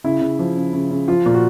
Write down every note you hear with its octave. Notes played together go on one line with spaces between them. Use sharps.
C#3 E4
C#3
F3
C#3
C#3
C#3
F3 F4
A#2
F#4